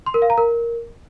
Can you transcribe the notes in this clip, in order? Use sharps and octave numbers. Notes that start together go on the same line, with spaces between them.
C6
A#4
F5
A#5
A#4